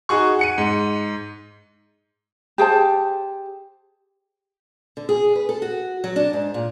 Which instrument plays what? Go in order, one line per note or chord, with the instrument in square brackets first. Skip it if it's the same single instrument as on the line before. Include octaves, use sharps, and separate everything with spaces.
[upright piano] D#4 F#4 G#4 C#6
F#5 C#7 D#7
G#2
[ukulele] G4 G#4 C5 A5
[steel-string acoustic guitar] D3
G#4
B4
A4
F#4
F#3
D4
G#2
A#2